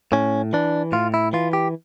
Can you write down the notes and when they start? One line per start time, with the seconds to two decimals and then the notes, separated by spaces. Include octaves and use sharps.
0.12 A2 C#4
0.53 E3 D4
0.92 A2 F4
1.14 E4
1.33 E3 F4
1.53 G4